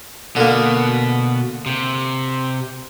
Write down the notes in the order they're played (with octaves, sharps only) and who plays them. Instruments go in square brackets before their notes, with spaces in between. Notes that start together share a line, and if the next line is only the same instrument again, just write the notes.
[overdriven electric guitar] B2 [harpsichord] D3 A#3
[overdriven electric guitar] C3